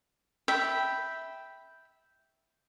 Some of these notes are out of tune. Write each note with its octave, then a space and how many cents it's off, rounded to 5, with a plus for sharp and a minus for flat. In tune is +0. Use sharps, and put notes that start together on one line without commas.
E5 -10 G5 +0 B5 +0